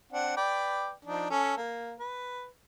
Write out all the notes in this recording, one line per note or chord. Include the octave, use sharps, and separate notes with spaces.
C4 D4 F#5
B4 D5 G5
F3 D4 D#4
C#4 A4
A#3
B4